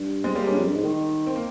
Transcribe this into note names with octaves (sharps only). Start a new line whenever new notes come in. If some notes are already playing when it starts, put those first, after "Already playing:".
Already playing: G2
G#3 C4
G3 A#3
A#3 C#4
G2
F2
G2
G#2
D#3
C4
A#3